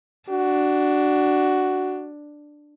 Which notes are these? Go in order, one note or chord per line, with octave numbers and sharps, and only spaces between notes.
D4 F#4